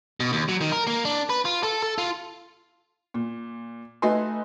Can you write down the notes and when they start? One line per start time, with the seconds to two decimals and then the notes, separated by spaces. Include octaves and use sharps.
0.20 B2
0.33 D#2
0.49 F#3
0.61 D#3
0.72 A#4
0.87 A#3
1.05 D4
1.30 B4
1.45 F4
1.63 A4
1.82 A4
1.98 F4
3.14 A#2
4.02 A3 D#4 F#4 B4 G#5 C6